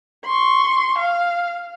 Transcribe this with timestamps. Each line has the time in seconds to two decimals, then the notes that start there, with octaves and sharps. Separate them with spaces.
0.25 C6 C#6
0.98 F5